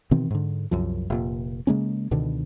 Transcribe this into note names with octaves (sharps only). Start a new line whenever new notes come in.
B2 D#3 E3 C4
G#2 D3
C2 F#2 F3
F1 A#2
C#3 G#3 A#3 C#4
C#2 B2 D3 D#3